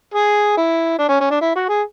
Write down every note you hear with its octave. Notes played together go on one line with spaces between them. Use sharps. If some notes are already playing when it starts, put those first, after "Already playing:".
G#4
E4
D4
C#4
C#4
D4
E4
F#4
G#4